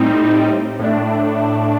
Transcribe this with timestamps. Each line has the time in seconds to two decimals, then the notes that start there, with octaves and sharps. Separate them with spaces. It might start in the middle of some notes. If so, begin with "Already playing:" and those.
Already playing: A2 G3 C4 D#4
0.79 A2 A3 D4